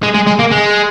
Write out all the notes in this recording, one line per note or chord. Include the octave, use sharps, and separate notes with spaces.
G#3
G#3
G#3
A#3
G#3